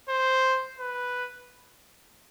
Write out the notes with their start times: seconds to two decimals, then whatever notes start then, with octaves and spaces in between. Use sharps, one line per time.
0.09 C5
0.79 B4